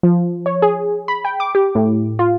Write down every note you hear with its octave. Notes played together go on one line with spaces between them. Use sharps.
F3
C#5
G#4
B5
G5
D6
G4
A2
F4